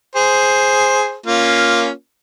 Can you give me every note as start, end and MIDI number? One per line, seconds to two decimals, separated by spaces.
0.16 1.15 68
0.16 1.15 72
1.26 1.90 58
1.26 1.90 61
1.26 1.90 65